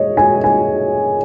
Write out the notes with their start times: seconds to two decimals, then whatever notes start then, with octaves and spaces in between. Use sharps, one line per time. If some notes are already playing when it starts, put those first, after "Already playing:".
Already playing: G#3 C#5 D#5
0.17 G#5
0.44 G#5